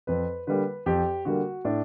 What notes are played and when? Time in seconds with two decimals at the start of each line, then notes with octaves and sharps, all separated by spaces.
0.07 F2 B4
0.47 D3 G3 A#3 B4
0.86 F2 G4
1.25 D3 G3 A#3 F#4
1.65 A2 D4